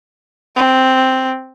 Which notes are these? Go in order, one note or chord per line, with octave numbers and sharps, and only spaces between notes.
C4